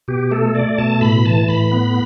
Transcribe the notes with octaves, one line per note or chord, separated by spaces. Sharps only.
B2 G4
A3 A4
A3 D5
B2 A5
A2 B5
E3 A5
A2 B5
B3